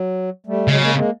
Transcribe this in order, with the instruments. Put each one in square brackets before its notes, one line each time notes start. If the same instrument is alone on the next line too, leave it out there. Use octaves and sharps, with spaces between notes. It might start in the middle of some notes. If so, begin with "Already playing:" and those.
Already playing: [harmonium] F#3
G3 A3
[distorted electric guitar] C#3 [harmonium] F#3 G#3
[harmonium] G#3 A#3
G#3 A#3